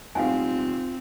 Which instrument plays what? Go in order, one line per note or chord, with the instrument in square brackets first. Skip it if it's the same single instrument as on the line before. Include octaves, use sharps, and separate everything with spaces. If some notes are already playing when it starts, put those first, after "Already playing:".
[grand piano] B1 A2 G3 [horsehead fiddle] C4 [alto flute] F4 [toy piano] F5 F#5 G#5